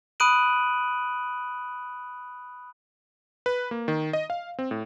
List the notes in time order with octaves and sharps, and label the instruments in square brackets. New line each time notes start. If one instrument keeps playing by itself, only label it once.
[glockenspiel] B5 D#6 F#6 D7 D#7 F#7
[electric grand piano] B4
A#3
D#3
D#5
F5
C4
A2